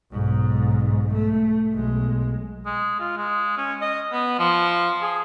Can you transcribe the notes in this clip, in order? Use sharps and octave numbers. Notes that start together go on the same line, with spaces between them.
B1 G#2
A3
B1 G#3
G#3
F4
G#3
C#4
D#5
B3
F3
G#4